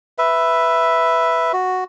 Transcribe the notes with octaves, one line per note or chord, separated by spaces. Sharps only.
B4 E5
F#4